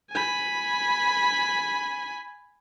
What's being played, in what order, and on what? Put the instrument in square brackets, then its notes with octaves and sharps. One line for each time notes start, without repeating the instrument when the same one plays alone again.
[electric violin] G#5 B5